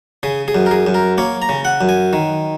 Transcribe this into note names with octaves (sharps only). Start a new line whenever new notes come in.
C#3 G#4
G#4
F#2
A#4
G#4
F#2
A#4
A#3 C#5
A#5
C#3
F#5
F#2
G#5
D#3